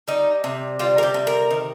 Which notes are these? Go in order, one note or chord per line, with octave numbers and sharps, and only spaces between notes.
G3 D#4
C3
G3 F4
A#4
G4
C3
A#4
D#3